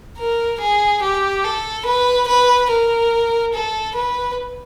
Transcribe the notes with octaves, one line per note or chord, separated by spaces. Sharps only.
A#4
G#4
G4
A4
B4
B4
A#4
A4
B4